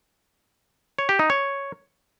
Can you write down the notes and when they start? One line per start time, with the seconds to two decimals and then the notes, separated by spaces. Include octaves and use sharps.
0.99 C#5
1.09 G4
1.19 D#4
1.30 C#5